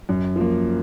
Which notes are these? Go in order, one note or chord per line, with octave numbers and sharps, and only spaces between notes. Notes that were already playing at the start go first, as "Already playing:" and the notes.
F#2
F3 A#3